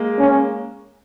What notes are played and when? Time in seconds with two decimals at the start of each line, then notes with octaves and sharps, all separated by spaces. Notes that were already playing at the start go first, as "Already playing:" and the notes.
Already playing: G#3 A#3
0.19 C#4